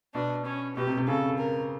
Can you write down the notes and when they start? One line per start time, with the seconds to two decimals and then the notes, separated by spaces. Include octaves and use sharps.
0.14 B2 D4
0.46 C#4
0.76 B2 G4
0.87 C3
0.97 C3
1.08 C#3 A4
1.39 A#4